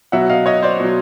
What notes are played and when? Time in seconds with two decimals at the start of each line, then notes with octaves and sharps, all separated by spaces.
0.12 B2 F#3 E5 F#5
0.30 D#5 F5
0.46 C#5 D#5
0.62 C5 D5
0.80 B2 F#3